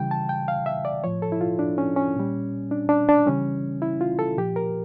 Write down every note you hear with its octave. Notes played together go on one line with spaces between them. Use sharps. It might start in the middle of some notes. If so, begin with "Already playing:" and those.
Already playing: C#3 E3 G3 G5
A5
G5
F5
E5
D5
A2 F3 C#5
A4
E4
F4
D4
C#4
C#4
A#2 G3
D4
D4
D4
C#3 E3 G3 C#4
E4
F4
A4
A#2 F3 G4
A#4